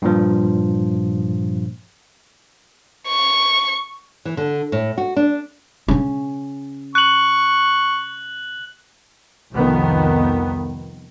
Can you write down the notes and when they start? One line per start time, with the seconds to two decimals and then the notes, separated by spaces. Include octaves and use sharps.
0.02 G2 A#2 F3
3.08 C#6
4.25 E3
4.37 D3
4.72 A2
4.98 F#4
5.16 D4
5.88 C#3 C#4
6.95 C#6 F#6 F#7
9.54 C2 F2 D#3 B3